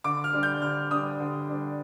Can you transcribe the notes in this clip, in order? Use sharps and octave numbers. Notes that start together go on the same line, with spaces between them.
D3 D6
F6
G3 D4
G6
D3 F6
G3 D4 D#6
D3
G3 D4